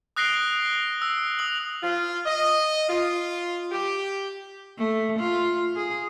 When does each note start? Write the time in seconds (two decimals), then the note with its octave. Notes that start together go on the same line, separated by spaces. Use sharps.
0.16 D#6 F#6 A#6 C7 D7 G7
1.02 E6
1.39 D#6 F#7
1.82 F4
2.26 D#5
2.89 F4
3.71 G4
4.78 A3
5.19 F4
5.76 G#4